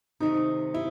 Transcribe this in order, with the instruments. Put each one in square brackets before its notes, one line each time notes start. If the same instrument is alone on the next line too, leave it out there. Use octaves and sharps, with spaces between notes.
[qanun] C3 D#3 A3 [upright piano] D#4
[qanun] C3 [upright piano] E4